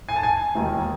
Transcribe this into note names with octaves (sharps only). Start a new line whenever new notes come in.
G#5
A5
G#5
E1 D#2 D#3